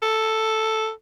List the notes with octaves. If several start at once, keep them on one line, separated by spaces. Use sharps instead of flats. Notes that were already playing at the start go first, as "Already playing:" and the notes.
A4